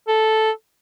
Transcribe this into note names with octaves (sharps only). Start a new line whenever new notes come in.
A4